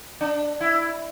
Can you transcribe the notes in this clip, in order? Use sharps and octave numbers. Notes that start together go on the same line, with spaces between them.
D4
E4